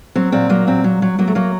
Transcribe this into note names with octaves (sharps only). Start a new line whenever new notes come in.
F#3 C4
A#2 C4
F#3 A#3
A#2 C4
F#3
F#3
F#3 A#3
A3
F#3 A#3